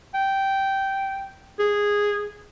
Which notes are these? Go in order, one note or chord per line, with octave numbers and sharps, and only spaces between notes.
G5
G#4